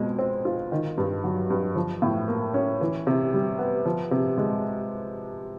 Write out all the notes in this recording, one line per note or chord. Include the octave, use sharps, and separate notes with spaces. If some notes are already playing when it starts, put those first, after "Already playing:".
Already playing: F2 B2 G#3
C4
F4
D#3
G2
F#3
G2
F3
A2
A#3
C#4
E3
C3
G3
B3
F3
C3
G#3